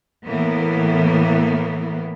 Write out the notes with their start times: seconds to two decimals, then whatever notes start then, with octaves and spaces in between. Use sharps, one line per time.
0.25 A2 E3 A#3 B3